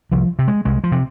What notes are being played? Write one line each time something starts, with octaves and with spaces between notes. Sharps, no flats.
C2 F3
C3
G#3
C2 G#3
F3
C3